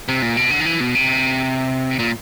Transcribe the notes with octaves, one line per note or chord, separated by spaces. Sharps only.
C3
A#2
B2
D3
D#3
E3
B2
C3
A#2